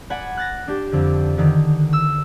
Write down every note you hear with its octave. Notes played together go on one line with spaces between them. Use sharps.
D5 F#5 G#5 B5
F#6 A6 A#6
D4 G4
F2 D3
D3 D#3
E6